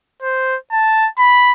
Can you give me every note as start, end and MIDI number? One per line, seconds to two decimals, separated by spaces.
0.22 0.57 72
0.72 1.08 81
1.19 1.52 83